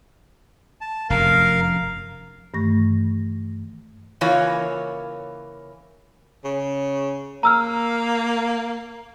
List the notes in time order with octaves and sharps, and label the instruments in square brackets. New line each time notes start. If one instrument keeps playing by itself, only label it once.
[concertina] A5
[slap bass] F1 F#2 [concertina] A#4 F5
[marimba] G2 D#3 E3 A3 C#6 A#6
[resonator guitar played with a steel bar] C#3 E3 A#3 F4 C#5
[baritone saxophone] C#3
[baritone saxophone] A#3 [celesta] A#5 E6 F6